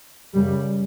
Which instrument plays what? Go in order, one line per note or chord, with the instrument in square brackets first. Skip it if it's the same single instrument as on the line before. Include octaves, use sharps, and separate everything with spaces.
[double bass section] F#2 C#3 G3